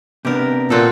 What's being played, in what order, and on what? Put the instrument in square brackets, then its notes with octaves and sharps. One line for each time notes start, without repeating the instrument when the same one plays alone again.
[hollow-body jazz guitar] C3 B3 D4 [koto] G4 A#4
[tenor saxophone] A#2 [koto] C4 F#4 A4